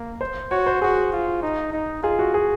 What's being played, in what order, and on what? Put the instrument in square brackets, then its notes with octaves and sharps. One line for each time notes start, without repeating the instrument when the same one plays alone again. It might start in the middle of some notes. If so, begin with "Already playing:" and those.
Already playing: [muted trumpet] A#3
[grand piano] C5
[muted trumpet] F#4 [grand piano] C#5
[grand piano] C5
[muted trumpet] F#4 [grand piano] G#4
[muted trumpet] F4
D#4
D#4
[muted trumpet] F4 [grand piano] G#4
[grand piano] F#4
G#4